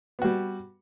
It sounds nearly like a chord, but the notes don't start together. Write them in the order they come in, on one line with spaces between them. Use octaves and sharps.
B3 F#4 G3